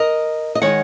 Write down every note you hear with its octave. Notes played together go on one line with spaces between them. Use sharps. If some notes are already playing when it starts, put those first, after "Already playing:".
Already playing: A#4 D#5
D#5
D#3 G#3 D#4 C#5 F#5